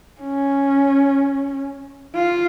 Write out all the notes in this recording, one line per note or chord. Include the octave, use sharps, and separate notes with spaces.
C#4
F4